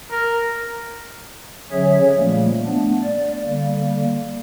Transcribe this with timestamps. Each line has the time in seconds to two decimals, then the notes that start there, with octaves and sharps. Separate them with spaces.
0.12 A#4
1.71 D3 F#3 C#4 G#4 C#5 E5
2.17 A#2 F3 G3 A3 A#3
2.66 A3 B3 D4
3.03 D5
3.44 D3 G3 A#3